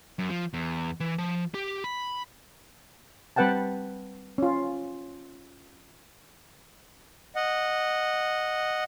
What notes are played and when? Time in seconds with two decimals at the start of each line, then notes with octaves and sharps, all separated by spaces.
0.19 F#2
0.30 F3
0.54 E2
1.00 E3
1.18 F3
1.54 G4
1.84 B5
3.36 G3 C4 B4 F#5 G5 A5
4.38 C#4 F4
7.36 D#5 F#5